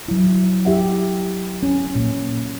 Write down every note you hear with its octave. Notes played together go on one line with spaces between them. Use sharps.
F#3 E4
E4 G4 E5 F#5
C#4
A#2 A#3